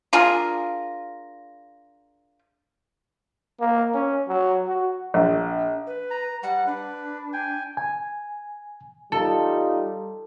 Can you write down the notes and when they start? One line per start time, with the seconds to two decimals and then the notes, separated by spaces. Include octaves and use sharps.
0.13 D4 F4 G#4 A#4
3.60 A#3
3.94 C#4
4.28 F#3
4.67 F#4
5.14 A#1
5.87 B4
6.11 A#5
6.43 G3 F#5
6.67 D4 B4
7.33 G5 G#5
7.77 G#5
9.12 G3 D#4 F4 A4